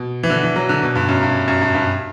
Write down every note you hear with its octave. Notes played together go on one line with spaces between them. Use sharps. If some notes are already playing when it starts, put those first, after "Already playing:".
Already playing: B2
E3
D3
E3
F#3
D3
B2
G2
F#2
G2
F#2
G2
G2